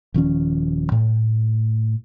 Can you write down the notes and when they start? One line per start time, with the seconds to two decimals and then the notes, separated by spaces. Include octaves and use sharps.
0.14 D#1 D#3 F3 C#4
0.92 A2